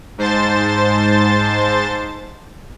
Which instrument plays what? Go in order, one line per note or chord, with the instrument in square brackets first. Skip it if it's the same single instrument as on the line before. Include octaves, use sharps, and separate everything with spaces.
[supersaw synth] G#2 C5 A5 A6